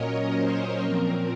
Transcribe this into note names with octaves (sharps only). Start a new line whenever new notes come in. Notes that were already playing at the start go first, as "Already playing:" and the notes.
Already playing: A#2 F#3 C#4 A#4 C#5 D#5
C5
A#2 F3 C4 A#4